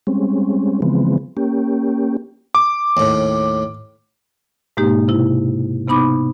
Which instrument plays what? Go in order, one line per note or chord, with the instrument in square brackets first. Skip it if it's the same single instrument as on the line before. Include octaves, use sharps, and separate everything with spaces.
[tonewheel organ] G3 G#3 C4 C#4
C#3 E3 F3 G#3 B3 C4
A#3 C#4 G4
[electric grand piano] D6
[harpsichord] D#2 A2
[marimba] G#2 B2 G#3 A#3 D#4 G4
C3 E4
C3 B3 D#4 B5 D6